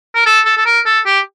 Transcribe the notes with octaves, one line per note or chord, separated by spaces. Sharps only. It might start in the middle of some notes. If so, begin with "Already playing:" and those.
A#4
A4
A4
A4
A#4
A4
G4